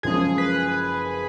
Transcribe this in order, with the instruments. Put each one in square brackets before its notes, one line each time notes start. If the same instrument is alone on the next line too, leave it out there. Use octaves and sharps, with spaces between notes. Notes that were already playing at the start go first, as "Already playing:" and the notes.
[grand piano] F#1 F#2 F3 G#3 C#4 [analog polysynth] G#4
[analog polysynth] B4